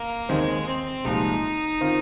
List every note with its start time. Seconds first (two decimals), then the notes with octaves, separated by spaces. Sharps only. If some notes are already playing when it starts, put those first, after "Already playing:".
Already playing: A#3
0.29 D#2 D#3 G#3 C4 D#4
0.67 C4
1.05 C2 A#2 F3 G#3 D#4
1.81 D#3 C4 F4